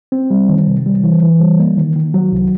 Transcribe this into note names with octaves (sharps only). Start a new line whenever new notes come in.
C4
G3
D#3
C3
G3
E3
E3
G3
A#3
D#3
D#3
F#3
C2